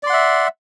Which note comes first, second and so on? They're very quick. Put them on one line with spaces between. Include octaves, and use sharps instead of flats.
D5 C6 F#5 E5